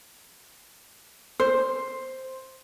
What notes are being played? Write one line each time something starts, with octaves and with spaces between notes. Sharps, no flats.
C5